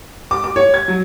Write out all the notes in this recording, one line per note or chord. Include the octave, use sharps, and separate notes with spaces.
D6
D6
C#5
G#6
F#3